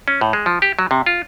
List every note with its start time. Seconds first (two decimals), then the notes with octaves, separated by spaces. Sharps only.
0.08 C#4
0.21 A2
0.33 G#3
0.46 F3
0.62 G4
0.79 F#3
0.91 C3
1.06 F4